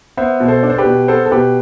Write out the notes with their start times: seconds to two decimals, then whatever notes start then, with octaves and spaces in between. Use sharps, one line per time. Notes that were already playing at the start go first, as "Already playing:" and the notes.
0.17 B3 C5 E5
0.40 B2
0.48 A4 C5
0.63 D4
0.70 C5
0.78 G4 B4
0.85 B2
1.08 B3 A4 C5
1.26 A4
1.32 B2 G4 B4